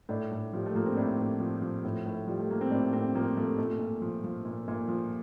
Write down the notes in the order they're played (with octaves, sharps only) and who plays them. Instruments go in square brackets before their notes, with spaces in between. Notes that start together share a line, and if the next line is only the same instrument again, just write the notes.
[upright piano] A2 D4
A2
F3 G3
A3
F3 A#3
C4
A2 D4
A2
F3
F3
A2
A2
F3 G3
A3
F3 A#3
C4
A2 D4
A2 C4
F3 A#3
F3 A3
A#2 A3
A#2
F3
F3
A#2
A#2
F3